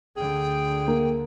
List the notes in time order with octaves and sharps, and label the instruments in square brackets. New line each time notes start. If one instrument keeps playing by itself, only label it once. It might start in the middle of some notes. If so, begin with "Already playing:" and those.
[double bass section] D2 D3 [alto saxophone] G#4 [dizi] G5
[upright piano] A#3